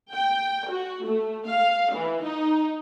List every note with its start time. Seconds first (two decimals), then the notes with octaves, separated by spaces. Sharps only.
0.13 G5
0.70 F#4
1.05 A3
1.48 F5
1.94 E3
2.24 D#4